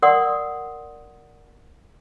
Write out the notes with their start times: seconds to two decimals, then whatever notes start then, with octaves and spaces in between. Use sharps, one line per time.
0.02 A#4 D5 F#5 C6 D#6